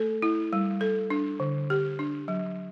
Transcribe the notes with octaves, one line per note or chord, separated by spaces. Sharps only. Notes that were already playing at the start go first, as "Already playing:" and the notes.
Already playing: A3 A4
E4
G3
A4
D4
D3
G4
D4
F#3